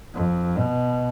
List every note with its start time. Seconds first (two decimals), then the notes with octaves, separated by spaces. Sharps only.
0.15 F2
0.58 B2